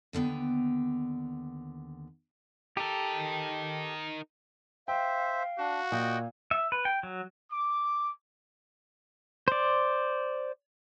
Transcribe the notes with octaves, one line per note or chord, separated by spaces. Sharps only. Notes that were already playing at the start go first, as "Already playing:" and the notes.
D#2 D3 B3 G5
D#4 G4 A4 A#4
C5 E5 F5 G5
D4 F#4
A#2 D#5 G5
E5
B4
G5
F#3
D6
C5 D5